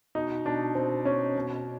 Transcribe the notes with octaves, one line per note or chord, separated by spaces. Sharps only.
B2 D#4
B2 D4
B2 C4
B2 C#4
B2